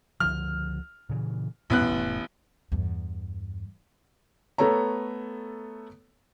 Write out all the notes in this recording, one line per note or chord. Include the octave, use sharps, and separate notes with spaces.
C#2 D3 F3 F6
A#2 C#3 E3
A1 E2 G2 B2 B3 F#6
F1 A2
E2 G2
A3 B3 A4 C#5 A#5